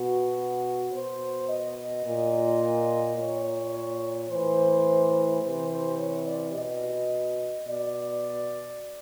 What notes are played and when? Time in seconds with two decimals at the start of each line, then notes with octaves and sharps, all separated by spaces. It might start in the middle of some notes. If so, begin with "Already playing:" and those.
Already playing: B2 F#4
0.91 B2 C5
1.48 D#5
2.04 A#2
3.16 A#2 C#5
4.29 A2 E3 C5
5.41 C3 E3 C5
5.70 C5
5.97 C#5
6.26 D5
6.54 B2 D#5
7.66 B2 D5